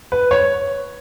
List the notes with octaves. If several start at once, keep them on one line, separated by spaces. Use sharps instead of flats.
B4
C#5